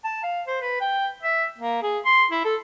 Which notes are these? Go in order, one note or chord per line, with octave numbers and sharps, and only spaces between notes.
A5
F5
C5
B4
G5
E5
A#3
G#4
C6
E4
A4